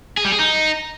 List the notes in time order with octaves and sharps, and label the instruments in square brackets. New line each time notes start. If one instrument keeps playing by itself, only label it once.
[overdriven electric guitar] G#4
G3
G#4
D#4